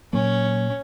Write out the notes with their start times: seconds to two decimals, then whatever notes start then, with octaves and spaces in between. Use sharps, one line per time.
0.13 A#2 F#3 A#3 C#4